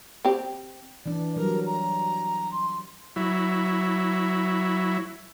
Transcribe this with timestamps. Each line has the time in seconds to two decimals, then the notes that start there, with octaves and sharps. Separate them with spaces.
0.25 C4 G4
1.06 E3 D4 D5
1.36 F#3 G3 A#4
1.66 A#5
2.52 C6
3.16 F#3 E4